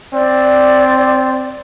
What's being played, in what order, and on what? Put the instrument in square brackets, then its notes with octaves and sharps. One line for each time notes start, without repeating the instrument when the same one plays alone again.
[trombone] C4 [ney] D5